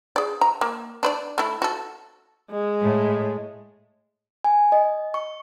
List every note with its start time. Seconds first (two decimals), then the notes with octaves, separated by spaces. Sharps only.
0.16 G#4 D5
0.41 A#5
0.61 A#3
1.03 D4 B4 D5
1.38 A3 E4
1.62 F#4 A4
2.51 G#3
2.82 A2
4.44 G#5
4.72 D#5
5.14 C#6